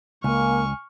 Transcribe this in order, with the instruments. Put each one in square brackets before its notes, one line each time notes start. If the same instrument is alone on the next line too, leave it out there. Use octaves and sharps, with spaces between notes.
[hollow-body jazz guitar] C#2 [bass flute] A#3 [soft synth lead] G#5 [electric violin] C#6 F6